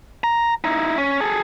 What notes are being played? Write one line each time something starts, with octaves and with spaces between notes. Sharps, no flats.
A#5
D#4 E4
C#4
G#4 A4